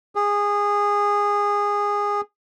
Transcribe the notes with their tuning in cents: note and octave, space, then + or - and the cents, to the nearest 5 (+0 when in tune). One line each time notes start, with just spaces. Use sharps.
G#4 -20